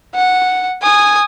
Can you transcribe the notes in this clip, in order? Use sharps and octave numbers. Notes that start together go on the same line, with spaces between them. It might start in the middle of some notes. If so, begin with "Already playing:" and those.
F#5
G#5 D#6